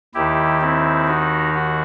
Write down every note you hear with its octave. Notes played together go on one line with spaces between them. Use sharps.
D#2 D#3 E4 G4
C4 E4
D#4 F#4
F#4